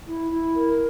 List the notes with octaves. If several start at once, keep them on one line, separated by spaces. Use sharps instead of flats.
E4
E4
A#4